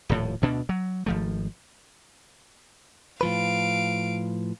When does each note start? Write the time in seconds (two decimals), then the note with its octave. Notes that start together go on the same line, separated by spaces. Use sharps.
0.09 D#1 A2 F3
0.42 D2 B2 D4
0.69 F#3
1.06 G#1 F3 A3
3.21 A2 F3 B4 F5 D7